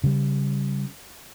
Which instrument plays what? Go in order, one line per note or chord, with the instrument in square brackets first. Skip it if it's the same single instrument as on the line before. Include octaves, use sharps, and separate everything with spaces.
[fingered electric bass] C#3 G3